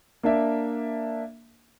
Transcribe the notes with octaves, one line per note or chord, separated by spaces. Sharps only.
A#3 D4 E5